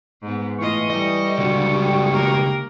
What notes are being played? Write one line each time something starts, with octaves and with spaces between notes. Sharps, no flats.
G#2 B3
A2 E3 F4 D#5 C#6
G3 A4 D#5
C#2 D3 F#4
G4
A#3 A#4